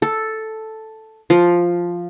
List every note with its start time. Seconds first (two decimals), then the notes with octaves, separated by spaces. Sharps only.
0.02 A4
1.30 F3